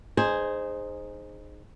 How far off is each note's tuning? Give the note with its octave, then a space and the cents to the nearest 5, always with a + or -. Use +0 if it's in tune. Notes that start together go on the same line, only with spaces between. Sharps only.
D#4 -20 G#4 +0 C5 +5